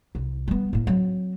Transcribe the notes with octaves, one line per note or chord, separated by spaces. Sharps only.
C2
G3 B3
A2 A#3
F#3 C4